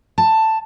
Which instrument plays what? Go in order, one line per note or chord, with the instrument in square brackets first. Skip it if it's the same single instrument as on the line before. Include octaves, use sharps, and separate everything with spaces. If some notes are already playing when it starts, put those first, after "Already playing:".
[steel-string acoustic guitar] A5